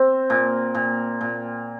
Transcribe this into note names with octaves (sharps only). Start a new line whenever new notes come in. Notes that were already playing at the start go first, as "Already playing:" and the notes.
Already playing: C4
A#2
A#2
A#2